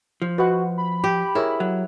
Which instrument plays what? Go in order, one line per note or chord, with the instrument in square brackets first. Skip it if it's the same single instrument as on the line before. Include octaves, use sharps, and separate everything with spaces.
[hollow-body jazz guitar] F3
[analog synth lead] F#4 [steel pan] B4 D#5 F#5
[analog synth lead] B5
[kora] G4
[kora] E4 [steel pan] G#4 A#4 C#5
[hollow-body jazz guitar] F#3